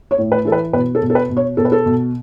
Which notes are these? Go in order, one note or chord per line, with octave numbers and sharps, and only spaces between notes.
C#5
A2
B4
E3 A4
B4
B2 B4
A4
B2
A4
B4
B2
C#5
B2 A4
B4
A4
B2